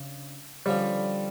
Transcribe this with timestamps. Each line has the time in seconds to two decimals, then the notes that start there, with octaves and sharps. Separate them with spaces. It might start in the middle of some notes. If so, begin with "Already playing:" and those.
Already playing: C#3 D4
0.66 D3 F3 G3 C#4